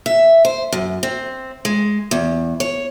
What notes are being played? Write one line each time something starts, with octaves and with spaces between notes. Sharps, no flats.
E5
C5
F#2
C4
G#3
E2
C#5